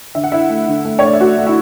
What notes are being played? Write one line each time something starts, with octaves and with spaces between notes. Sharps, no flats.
D3 E5
F#5
D3 E4 E5
A3
D3
A3
C#5
A3 D5
E5
A3 F#4 F#5
A3
E4 E5